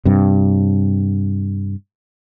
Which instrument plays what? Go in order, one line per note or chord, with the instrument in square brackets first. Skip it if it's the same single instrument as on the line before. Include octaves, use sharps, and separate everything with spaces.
[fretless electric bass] G2 C3